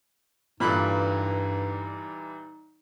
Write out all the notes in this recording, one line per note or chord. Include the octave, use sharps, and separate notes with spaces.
G2 A#2 E3 G3 D#4 A4 B5 F#6